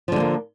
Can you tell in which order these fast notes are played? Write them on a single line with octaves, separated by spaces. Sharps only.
F3 D3 G#3 A#3